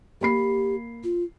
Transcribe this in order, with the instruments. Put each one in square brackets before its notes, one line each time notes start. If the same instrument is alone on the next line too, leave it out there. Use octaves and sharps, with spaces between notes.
[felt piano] A#3 B5 C7 [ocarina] G4
[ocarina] F4